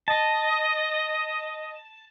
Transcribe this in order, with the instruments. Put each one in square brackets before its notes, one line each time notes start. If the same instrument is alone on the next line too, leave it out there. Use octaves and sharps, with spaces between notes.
[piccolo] D#5 [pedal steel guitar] A5